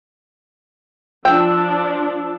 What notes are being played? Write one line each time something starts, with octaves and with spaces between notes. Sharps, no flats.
F3 D4 G5 E6